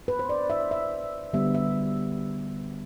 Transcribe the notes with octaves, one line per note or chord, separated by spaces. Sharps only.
B4
C5
D5
E5
E5
D3 G3 B3 E5
E5